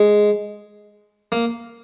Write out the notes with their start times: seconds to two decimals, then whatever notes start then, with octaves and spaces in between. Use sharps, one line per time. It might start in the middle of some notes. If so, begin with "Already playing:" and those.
Already playing: G#3
1.32 A#3